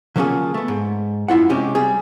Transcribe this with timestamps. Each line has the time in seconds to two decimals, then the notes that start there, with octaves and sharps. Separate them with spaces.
0.16 D3 F#3 A#3 C#4 F4 G#4
0.54 A3 B3
0.68 G#2
1.28 F#2 E4 F4 F#5
1.49 C3 G#3 C#4 G4
1.75 G3 G#4